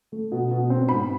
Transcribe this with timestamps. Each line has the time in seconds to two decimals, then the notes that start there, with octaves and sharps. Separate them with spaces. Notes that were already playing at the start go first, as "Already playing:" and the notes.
0.12 A3
0.32 B2
0.51 B2
0.70 C4
0.89 G#2 B5